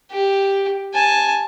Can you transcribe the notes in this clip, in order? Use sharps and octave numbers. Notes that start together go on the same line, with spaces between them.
G4
G#5 A5